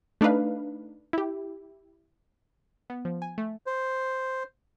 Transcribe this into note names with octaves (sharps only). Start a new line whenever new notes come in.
A3 D4 D#4 B4 F5
E4 G4
B3
F3
G#5
A3
C5